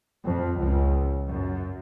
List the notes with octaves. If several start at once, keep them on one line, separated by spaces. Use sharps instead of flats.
F2
C#2
F#2